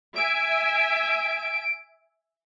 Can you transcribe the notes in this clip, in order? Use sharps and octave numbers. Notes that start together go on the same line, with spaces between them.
E5 G#5 D7